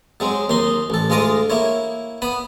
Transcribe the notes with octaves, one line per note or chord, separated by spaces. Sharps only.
F#3 G#3 C4
D#2 D#4 C6
A1 A4
D2 G#3 F4 A#5 D6 D#6
A#3 E4 C#5
B3 B5 D#6